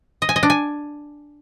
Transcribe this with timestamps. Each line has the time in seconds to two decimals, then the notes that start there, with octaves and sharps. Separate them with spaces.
0.22 D#5
0.29 G#5
0.36 D#5
0.43 D4
0.50 G#5